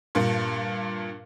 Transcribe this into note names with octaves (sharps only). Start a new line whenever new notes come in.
G2 A#2